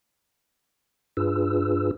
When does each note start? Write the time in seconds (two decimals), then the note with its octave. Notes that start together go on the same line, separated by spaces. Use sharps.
1.17 G2 D4 F4 G#4 B4 E6